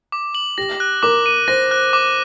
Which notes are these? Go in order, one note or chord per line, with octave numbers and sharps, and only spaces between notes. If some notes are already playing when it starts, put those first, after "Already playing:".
D6
F#7
G4 A#6
F#6
A#4 D6
D#7
C5 A#6
F#6
D6